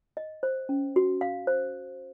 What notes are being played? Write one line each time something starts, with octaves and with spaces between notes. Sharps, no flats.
D#5
C5
C#4
F#4
F5
C5